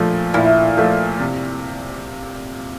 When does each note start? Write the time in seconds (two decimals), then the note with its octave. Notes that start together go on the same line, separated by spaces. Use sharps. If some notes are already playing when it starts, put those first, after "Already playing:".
Already playing: A#2 F3 A3
0.34 A#2 E4
0.77 F3 A3
1.20 C3